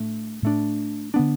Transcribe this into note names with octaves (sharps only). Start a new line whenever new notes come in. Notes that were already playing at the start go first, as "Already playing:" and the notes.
Already playing: A2 A3 D4
A2 A3 D4
D3 B3 D4